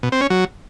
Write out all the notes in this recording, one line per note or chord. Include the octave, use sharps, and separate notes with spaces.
B2
C4
C#4
F#3